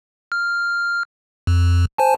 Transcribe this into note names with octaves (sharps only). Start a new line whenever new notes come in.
F6
F2
C5 G#5 A5